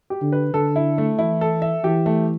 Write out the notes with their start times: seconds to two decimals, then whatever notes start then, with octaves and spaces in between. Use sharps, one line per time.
0.10 G4
0.21 D3
0.32 B4
0.54 D3 A4
0.76 E4
0.98 A3
1.19 E3 E4
1.41 A4
1.62 E5
1.84 E3 G4
2.06 A3